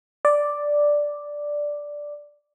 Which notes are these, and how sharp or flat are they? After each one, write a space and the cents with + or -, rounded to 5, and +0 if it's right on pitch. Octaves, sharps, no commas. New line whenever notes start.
D5 +0